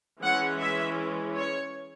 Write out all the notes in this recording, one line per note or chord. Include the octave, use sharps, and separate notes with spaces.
E3 G#3 C#4 F#5
E5
C#5